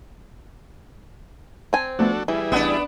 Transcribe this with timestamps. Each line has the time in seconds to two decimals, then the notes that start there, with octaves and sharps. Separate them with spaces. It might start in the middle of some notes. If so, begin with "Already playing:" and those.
1.73 C4 G#5
1.99 F3 A3 B3 D4 F#4 A4
2.28 E3 G3 E4 G#4
2.52 A1 B3 D4 D#5 F#5